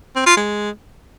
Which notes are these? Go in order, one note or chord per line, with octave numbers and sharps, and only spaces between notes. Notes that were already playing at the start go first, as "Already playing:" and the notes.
C4
F4
G#3